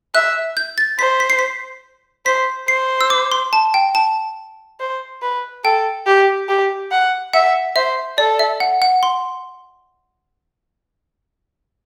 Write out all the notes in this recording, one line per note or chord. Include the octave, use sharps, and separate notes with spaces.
E5 F#6
G6
A6
C5 B6
B6
C7
B6
C5 B6
C5 C7
E6
D6
C6
A5
G5
A5
C5
B4
A4 G5
G4
G4
F#5
E5 F#5
C5 E5
A4 D5
E5
F#5
F#5
C6